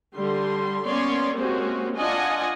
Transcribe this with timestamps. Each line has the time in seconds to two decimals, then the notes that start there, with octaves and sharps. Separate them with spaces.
0.15 D3 G3 C6
0.85 A#3 B3 C#4 C#5 D5 C6
1.36 G#3 A#3 C4 C#4 F#4 G4
1.97 D4 F4 D5 D#5 F#5 G#5